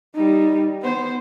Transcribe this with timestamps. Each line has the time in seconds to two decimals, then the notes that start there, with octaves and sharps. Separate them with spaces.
0.15 G3 D#4
0.82 B3 C5